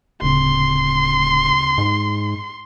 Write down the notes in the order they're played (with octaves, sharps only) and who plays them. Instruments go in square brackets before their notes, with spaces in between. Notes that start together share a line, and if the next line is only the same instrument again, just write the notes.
[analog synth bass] D1 [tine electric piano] D2 C#3 C4 [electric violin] C6
[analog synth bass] G#2